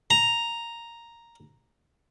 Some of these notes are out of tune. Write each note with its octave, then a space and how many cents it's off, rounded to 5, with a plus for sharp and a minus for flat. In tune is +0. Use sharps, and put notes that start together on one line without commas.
A#5 +0